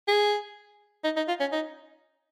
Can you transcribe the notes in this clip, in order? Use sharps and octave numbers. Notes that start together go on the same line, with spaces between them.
G#4
D#4
D#4
F4
C#4
D#4